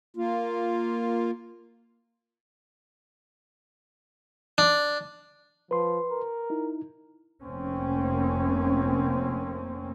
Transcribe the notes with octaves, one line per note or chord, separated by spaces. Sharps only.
A#3 F4
D4
F3 B4 C6
A#4
D#4 E4
F1 A#3 C4 C#4